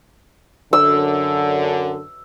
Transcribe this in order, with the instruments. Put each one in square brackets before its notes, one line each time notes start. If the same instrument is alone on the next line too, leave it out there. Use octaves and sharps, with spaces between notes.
[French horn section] F#2 D3 [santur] E6